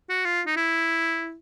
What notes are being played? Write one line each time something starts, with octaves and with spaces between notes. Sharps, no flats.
F#4
F4
D#4
E4